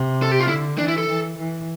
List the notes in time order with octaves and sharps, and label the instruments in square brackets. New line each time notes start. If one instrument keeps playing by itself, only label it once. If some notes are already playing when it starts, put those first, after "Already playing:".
Already playing: [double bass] C3
[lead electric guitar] A4
G4
F4
[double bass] D3 [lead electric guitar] E4
[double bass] E3 [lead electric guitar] D4
[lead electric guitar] E4
A4
[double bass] E3
E3